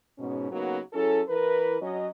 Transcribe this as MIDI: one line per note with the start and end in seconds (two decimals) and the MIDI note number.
0.18 0.50 44
0.18 0.50 47
0.18 0.50 61
0.52 0.78 49
0.52 0.78 54
0.52 0.78 58
0.52 0.78 59
0.52 0.78 63
0.52 0.78 66
0.93 1.20 54
0.93 1.20 61
0.93 1.20 64
0.93 1.20 68
0.93 1.20 69
1.28 1.77 52
1.28 1.77 70
1.28 1.77 71
1.81 2.07 54
1.81 2.07 61
1.81 2.07 75